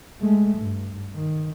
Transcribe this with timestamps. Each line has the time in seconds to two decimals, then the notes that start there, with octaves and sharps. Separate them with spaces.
0.21 G#3 A3
0.58 G2
1.15 D#3